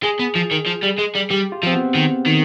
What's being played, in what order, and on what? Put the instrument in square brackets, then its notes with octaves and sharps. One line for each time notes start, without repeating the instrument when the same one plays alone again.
[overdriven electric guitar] G#3 [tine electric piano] G#4
[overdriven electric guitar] B3
F3
D#3
F3
G3
G#3
G3
[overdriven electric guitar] G3 [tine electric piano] G4
[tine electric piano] F4
[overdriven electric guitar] F3 [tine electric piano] C4
[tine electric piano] B3
[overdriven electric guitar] D#3
D#3